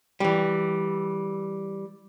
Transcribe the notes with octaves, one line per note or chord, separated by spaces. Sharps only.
E3 G3